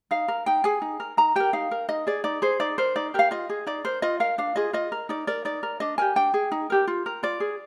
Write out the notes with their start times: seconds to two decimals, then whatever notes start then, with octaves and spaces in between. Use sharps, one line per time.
0.11 D#4 F5
0.28 A#4
0.46 D#4 G5
0.64 G#4 G#5
0.82 D#4
1.00 A#4
1.17 D#4 A#5
1.36 G4 A#4 G5
1.53 D#4 F5
1.71 A#4
1.89 D#4 D#5
2.07 G#4 D5
2.24 D#4 D5
2.42 G#4 C5
2.60 D#4 D5
2.78 A#4 C5
2.96 D#4 D5
3.14 G4 A#4 F5
3.31 F4 D#5
3.50 G#4
3.67 D#4 D5
3.85 A#4 C5
4.02 F4 D#5
4.20 A#4 F5
4.38 D4 F5
4.56 F4 G#4 D#5
4.73 F4 D#5
4.92 A#4
5.09 D#4 D5
5.27 A#4 D5
5.45 D#4 D5
5.63 A#4
5.80 D4 D#5
5.98 G4 A#4 G#5
6.16 D4 G5
6.34 G#4
6.52 D#4
6.70 G4 A#4
6.87 F4
7.06 A#4
7.23 F4 D5
7.40 G#4